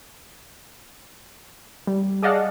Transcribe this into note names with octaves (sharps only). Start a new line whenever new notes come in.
G3
G#4 D5 D#5 F5 F#5 A5